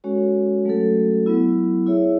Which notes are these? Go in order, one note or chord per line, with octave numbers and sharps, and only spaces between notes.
G#3 C#4 F#4 A4 C#5
F#3 A3 C#4 F#4 A4
F#3 B3 E4
E4 G#4 C#5 E5